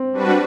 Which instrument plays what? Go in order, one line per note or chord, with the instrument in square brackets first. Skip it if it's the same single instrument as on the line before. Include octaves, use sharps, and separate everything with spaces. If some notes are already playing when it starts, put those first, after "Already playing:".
Already playing: [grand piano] C4
[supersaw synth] G3 D4 F#4 B4